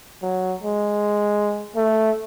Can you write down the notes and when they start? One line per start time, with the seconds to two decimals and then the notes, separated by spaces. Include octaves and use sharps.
0.22 F#3
0.61 G#3
1.76 A3